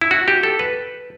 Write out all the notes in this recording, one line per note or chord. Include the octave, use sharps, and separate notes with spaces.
E4
F#4
G4
A4
B4